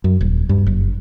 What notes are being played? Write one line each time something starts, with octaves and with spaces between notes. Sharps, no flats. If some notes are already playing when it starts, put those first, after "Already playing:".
F#2
D#1
G2
F#1